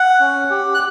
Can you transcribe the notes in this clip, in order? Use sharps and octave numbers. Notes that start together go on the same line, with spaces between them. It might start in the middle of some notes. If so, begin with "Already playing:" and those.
Already playing: F#5
C#4
G4
F#6